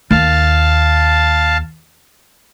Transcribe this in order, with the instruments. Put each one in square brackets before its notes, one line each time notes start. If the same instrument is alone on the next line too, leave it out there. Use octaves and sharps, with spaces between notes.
[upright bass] D#2 [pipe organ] F5 A5